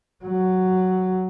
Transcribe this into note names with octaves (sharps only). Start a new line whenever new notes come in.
F#3